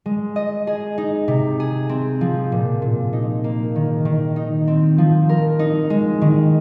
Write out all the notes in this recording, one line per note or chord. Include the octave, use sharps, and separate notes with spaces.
G#3
D#5
G#4
D#4
C3
G#4
C4
F3
A#2
A#2
D#4
A#3
D#3
D#3
D#4
C4
F3
A#4
D#4
G#3
D#3